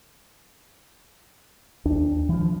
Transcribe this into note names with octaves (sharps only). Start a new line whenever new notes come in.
D#2 D4
E3 F3